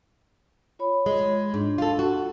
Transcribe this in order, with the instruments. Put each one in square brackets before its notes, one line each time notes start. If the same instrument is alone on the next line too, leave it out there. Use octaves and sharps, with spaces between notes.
[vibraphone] F4 C#5 B5
[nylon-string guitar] G#3
[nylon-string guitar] G#2 [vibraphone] D4
[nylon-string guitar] F4 A4
F#4